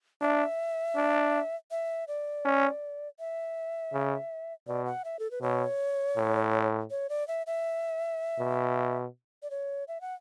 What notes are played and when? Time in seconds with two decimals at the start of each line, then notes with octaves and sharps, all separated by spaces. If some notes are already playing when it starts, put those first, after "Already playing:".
0.21 D4 E5
0.95 D4
1.71 E5
2.08 D5
2.45 C#4
3.19 E5
3.93 C#3
4.67 B2 D5
4.86 F#5
5.05 E5
5.19 A4
5.31 B4
5.42 B2 C#5
6.17 A2
6.91 C#5
7.09 D5
7.28 E5
7.47 E5
8.39 B2
9.43 D5
9.51 C#5
9.88 E5
10.01 F#5